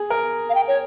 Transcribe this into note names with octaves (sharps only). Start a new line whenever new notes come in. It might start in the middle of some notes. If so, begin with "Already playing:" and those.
Already playing: G#4
A#4
F5
G5
C#5